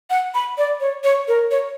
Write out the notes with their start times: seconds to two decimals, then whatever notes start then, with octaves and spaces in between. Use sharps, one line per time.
0.10 F#5
0.35 B5
0.58 D5
0.80 C#5
1.04 C#5
1.28 A#4
1.51 C#5